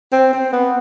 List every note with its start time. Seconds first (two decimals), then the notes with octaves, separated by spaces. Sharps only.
0.12 C4
0.33 C4
0.53 B3